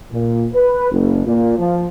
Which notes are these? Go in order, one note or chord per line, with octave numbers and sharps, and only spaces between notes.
A#2
B4
F#1
A#2
F3